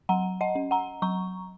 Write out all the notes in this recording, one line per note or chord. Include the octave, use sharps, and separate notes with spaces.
F#3 F#5 A#5
D#5 F#5
C#4
F#5 A#5
F#3 A#5 C#6